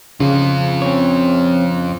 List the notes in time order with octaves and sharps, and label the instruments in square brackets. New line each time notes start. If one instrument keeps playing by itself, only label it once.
[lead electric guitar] F2 F4 [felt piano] C#3
[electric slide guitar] C4 C#5